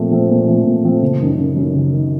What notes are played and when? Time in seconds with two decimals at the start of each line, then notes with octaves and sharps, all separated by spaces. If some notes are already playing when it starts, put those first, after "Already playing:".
Already playing: A#2 F3 A3 C4
0.11 F3 A3 C4
0.29 A#2
0.47 F3 A3 C4
0.65 A#2
0.84 F3 A3 C4
1.02 F#1
1.20 F#2 D#3
1.38 F#1
1.56 F#2 D#3
1.74 F#1
1.93 D#3